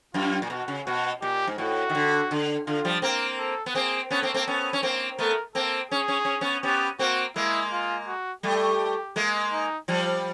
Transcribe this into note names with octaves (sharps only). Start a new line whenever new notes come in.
F#2 F4
A#2
B2 F#4
C#3
B2 F#4
A#2 G4
G#2
A2 F#4
D#3
D3
D3
D3 F4
F3 G3
A#3 C4 A#4
A4
B3
A#3 C4 G#4
B3 C#4 A4
A#3 C4
A#3 C4
B3 C#4
C#4
A#3 C4
A3 B3 A#4
A#3 C4 A4
C#4 G#4
C#4
C#4
B3 C#4
B3 C#4 G4
A#3 C4 F#4
G#3 A#3 E4
F4
F#4
G3 A3 G4
G#3 A#3
D#4
F3 G3